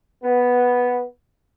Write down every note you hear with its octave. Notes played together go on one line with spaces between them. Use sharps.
B3